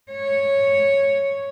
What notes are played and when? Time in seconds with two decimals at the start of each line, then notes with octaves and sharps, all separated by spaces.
0.11 C#5